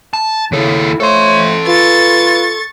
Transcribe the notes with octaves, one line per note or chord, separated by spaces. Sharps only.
A5
D#2 C#3 E4 A4
A2 F3 A3 A4 C#5 C6
F4 B4 C#6 A6